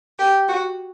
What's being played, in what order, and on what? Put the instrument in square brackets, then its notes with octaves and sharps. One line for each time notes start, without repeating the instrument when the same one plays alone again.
[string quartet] G4
F#4